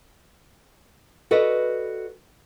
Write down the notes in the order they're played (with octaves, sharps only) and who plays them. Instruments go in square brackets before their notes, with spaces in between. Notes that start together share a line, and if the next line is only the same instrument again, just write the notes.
[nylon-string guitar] F#4 A4 B4 D5 D#5